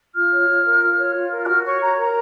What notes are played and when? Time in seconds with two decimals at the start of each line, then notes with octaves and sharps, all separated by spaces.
0.14 F4 F6
0.30 C#5
0.48 F4
0.65 A#4
0.81 F4
0.98 C#5
1.15 F4
1.30 A#4
1.44 F#6
1.47 F#4 F6
1.65 C#5 C#6
1.81 F#4 A#5
1.98 A#4 A#5